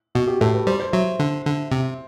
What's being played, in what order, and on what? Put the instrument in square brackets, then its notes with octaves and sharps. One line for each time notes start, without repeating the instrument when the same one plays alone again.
[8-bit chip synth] B2 [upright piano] F#4
[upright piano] G4
[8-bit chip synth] A2 [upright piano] A4
[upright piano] B4
[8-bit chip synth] G3 [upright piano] C5
[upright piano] C5
[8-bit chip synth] F#3 [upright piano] E5
[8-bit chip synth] D3
D3
C3